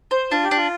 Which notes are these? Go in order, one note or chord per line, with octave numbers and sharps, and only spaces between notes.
C5
D4 F4
G4
D4
F4